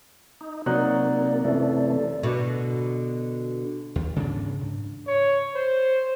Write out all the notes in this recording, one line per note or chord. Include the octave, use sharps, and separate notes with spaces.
D#4
C3 F#3 A#3 D#4 D5 F#6
F#2 C3 E3 A3
B2 D3
D#2
G#2 C#3 E3 B3 C#4 D4
D1 G#2
C#5
C5